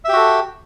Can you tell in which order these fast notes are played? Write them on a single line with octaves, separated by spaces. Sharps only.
E5 G4 F#4 A4